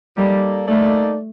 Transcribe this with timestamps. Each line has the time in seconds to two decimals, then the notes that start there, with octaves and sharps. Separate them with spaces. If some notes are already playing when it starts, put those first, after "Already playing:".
0.16 G3 A#3 D#4 A4 D5
0.67 A3 A#3 D#4 A4 D5